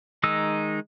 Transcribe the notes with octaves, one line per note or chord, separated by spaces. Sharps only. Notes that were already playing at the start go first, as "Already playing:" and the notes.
D#3 G#3 D#4 E6